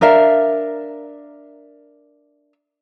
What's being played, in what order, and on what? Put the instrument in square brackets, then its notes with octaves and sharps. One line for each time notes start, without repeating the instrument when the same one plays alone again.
[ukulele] D4 A#4 E5 F5